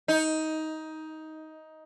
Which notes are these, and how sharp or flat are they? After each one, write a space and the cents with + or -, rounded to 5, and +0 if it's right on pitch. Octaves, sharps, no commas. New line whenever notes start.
D#4 +15